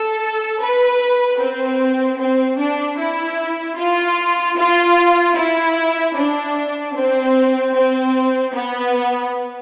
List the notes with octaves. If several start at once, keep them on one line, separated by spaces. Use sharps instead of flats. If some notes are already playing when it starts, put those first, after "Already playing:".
Already playing: A4
B4
C4
C4
D4
E4
F4
F4
E4
D4
C4
C4
B3